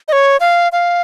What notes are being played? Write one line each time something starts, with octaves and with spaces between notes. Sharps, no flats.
D#5
C#5
F5
F5